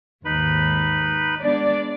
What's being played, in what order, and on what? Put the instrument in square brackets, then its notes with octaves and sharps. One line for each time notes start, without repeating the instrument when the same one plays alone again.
[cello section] D#2 G#2 [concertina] D#4 B4 B5
[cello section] G#3 B3 D4 [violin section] D5